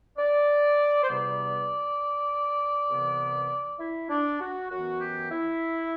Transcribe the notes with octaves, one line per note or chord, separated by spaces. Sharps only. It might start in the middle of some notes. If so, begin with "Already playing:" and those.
D5
C5
E2 C3 G3 B3 D5
C2 C3 E3 B3
E4
D4
F#4
F#2 E3 B3 F#4
G4
E4